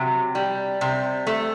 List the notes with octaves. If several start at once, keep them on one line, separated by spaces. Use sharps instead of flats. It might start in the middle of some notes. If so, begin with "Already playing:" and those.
Already playing: C3 F#3
G3
C3
A3